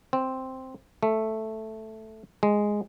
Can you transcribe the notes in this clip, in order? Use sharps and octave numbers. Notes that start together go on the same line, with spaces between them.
C4
A3
G#3